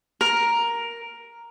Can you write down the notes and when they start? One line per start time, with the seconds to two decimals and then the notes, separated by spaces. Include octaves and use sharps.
0.21 A#4